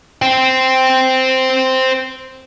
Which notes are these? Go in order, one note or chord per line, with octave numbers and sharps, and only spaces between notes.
C5 G5